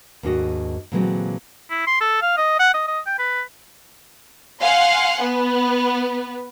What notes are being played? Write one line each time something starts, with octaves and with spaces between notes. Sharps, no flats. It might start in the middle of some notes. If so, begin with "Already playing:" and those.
D#2 G#2 D4 F#4 D#5
A#2 D3 E3 F#3 G#3 C4
E4
C6
A4
F5
D#5
F#5
D#5
D#5
G5
B4
F5 F#5 G#5 C6
B3